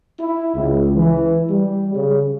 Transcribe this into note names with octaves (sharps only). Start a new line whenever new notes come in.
E4
C#2
E3
G3
C#3